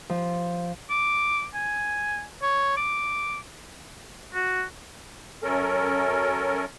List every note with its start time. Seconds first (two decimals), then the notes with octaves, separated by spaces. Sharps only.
0.10 F3
0.90 D6
1.54 G#5
2.42 C#5
2.77 D6
4.34 F#4
5.43 F#2 C#4 A4 A#4